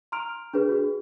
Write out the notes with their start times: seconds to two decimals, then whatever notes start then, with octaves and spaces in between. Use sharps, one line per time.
0.12 A#5 C6 F6 D7 F7
0.54 D4 G#4 B4
0.69 F#4 G#4